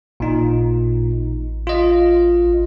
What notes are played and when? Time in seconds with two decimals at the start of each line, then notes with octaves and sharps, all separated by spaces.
0.20 A1 A#2 D#4
1.67 F4 D#5